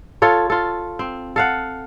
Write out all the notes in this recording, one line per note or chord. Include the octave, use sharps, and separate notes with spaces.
F4 A4 C#5
F4 A4
C4
A4 F5 F#5